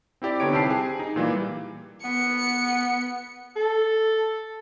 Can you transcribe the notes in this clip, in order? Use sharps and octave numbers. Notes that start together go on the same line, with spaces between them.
C4 E4 G4 D5
D3 B3 D#4 C#5 D7
C2 C4 E4 G4 A5 C7
G#4
D#4
A#2 E3 G3 A#3
B3 C#7
A4